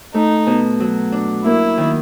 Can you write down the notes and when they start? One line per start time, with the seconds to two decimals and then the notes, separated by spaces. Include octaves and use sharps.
0.14 A3 D#4
0.47 B2
0.80 F#3
1.12 D4
1.45 A#3 E4
1.78 D#3